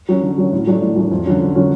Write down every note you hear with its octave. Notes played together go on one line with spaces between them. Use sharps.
F#3 C#4
D3
F#3 C#4
A2
F#3 A3 D4
A2
F#3 A3 D4
F2
D3 F#3 C#4
F2
D3 F#3 C#4